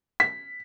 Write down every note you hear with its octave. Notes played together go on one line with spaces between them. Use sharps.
B6